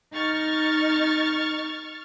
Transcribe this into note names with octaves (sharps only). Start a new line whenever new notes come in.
D#4 C#6 F6 A6